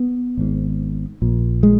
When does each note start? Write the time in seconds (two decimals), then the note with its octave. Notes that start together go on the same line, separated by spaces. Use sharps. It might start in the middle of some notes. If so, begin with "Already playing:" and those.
Already playing: B3
0.37 G#1 G#2
1.22 A#1 A#2
1.63 G#3